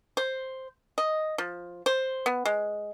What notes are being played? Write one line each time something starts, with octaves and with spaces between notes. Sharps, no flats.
C5
D#5
F3
C5
B3
G#3